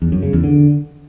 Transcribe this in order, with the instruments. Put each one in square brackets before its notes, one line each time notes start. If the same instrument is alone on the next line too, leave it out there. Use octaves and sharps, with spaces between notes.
[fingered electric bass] E2
F#2
C#3
E2
D3